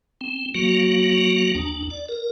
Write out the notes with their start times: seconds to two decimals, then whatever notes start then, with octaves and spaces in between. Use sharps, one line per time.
0.21 C4
0.55 F#3 A#3 F#4
1.55 D#2 D4
1.90 D5
2.09 A#4